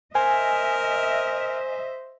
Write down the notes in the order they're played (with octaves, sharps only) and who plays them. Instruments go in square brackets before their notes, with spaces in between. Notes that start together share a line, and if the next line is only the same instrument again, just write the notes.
[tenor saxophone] A#4 [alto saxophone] C5 [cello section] D#5 E5 [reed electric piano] G#5